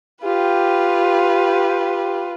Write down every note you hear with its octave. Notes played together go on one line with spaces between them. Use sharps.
F4 G4 B4